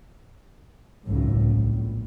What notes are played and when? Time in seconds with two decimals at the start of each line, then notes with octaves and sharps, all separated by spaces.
1.07 G#1 C#2 F#2 A2
1.45 A#1